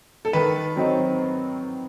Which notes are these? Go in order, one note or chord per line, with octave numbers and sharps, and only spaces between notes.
A4
D#3 B4
F#3 C4 D#4